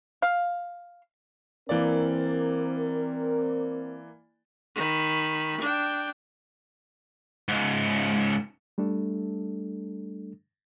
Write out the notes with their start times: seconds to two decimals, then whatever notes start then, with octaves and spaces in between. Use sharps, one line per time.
0.22 F5
1.69 E3 A#3 C4 A#4 D5
4.76 D#3 B5
5.60 D4 G5
7.48 C#2 G#2
8.78 G3 A3 D4 A4